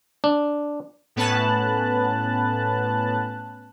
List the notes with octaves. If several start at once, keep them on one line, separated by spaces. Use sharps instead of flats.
D4
A2 B3 C#4 B4 A5 F#6